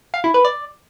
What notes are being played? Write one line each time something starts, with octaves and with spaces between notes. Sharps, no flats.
F5
E4
B4
D5